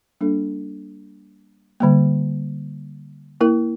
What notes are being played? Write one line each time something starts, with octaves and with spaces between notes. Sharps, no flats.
G3 A#3 D4 A4
D3 G3 A#3
A#3 E4 A#4